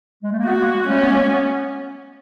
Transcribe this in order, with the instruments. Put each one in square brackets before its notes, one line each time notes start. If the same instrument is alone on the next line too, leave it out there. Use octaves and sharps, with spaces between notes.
[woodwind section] G#3
A3
A#3
[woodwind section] A3 B3 [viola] F#4
[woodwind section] G#3 A#3
G#3 A#3
[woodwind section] G3 A3 [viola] C#4
[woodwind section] B3
G#3 A#3
A3 B3